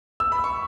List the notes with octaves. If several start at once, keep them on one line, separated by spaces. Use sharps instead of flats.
E6
B5
C#6